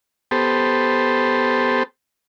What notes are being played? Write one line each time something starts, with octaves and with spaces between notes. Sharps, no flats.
B3 G4 A4 C5